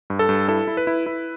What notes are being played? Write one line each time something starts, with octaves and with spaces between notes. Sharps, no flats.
G2
A4
G2
E4 A4
E4
B4
E4
E4